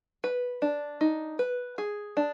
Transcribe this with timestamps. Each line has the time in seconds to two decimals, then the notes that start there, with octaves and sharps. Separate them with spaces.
0.24 B4
0.62 D4
1.01 D#4
1.39 B4
1.78 G#4
2.17 D4